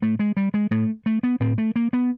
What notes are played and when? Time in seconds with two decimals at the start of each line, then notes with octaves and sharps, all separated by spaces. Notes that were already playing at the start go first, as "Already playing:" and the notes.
0.02 A2 A3
0.19 G#3
0.37 G3
0.54 G#3
0.71 A2 A3
1.06 A3
1.23 B3
1.40 A2 C4
1.58 A3
1.76 A#3
1.93 B3